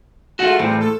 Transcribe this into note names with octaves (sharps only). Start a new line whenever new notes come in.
G#3 A3 F4 F#4 F#5
E2 A2 G3 C4
A4